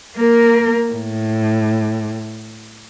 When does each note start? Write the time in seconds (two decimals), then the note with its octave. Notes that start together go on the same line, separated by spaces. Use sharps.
0.17 A#3 A#4
0.92 A2